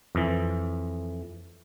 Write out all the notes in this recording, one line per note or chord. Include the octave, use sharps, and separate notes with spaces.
F2 E3